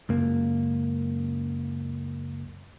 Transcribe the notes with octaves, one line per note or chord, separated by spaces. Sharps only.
C#2 F#2 A#3